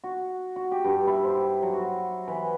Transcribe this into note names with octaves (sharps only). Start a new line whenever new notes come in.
F#4
F#4
G4
G2
E4
C5
F#3
F#4
E3